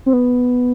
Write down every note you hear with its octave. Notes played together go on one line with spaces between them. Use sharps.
C4
B3